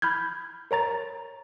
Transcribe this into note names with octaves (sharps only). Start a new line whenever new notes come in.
B5 F6 G6 G#6
A#4 C#5 A#5 A6